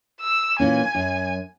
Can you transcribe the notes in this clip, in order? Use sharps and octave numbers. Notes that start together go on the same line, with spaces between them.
E6
A#2 E3 C#4 G#5
F#2